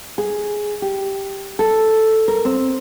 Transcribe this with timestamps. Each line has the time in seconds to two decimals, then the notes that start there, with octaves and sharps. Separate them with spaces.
0.18 G#4
0.82 G4
1.59 A4
2.28 A#4
2.45 C4